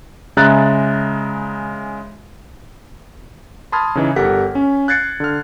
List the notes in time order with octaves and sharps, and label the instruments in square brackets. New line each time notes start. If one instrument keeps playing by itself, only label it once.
[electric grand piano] C#3 G#3 E5 A#5 F#6 A6
A5 B5 C6 D#6 F6 G#6
C#3 E3 D#4
G1 G4 A4 A#4 F#5 B6
C#4
F#6 G#6 A6 C7 C#7
D3 F6